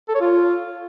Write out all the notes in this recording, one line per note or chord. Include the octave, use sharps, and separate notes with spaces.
A4
C#5
F4